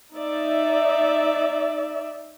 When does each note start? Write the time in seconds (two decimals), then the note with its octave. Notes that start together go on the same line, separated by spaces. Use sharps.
0.14 D#4 D5 E5